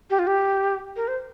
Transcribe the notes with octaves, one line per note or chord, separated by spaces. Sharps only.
G4
F4
G4
A#4
C5